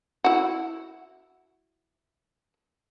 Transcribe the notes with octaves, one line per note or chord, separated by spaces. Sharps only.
E4 F#4